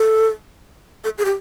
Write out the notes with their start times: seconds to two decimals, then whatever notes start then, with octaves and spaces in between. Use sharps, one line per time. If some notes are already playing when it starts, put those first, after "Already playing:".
Already playing: A4
1.04 A4
1.18 G#4
1.25 G4